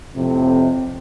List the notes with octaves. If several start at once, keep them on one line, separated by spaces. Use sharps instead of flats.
F2 A2 C3